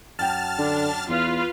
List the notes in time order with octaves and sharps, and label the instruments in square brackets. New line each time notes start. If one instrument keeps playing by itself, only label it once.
[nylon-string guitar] F#2 F#3 G5 [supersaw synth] A5 F6 A6
[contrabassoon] D3 [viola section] D4
[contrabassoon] E2 [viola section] F4 B4 F5